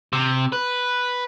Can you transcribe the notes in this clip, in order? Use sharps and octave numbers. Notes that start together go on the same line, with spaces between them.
C3
B4